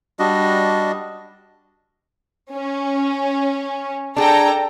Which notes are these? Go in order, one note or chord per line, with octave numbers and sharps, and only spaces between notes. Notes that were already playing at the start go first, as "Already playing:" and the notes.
G3 D4 F#4 D#5
C#4
D4 G#4 A4 G5 A#5